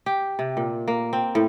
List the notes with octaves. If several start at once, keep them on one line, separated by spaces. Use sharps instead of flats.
G4
C3
A#2
A#3
C4
A2